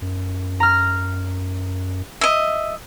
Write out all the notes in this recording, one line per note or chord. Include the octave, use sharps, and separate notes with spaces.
F#2
A#5 F6
D#5 E5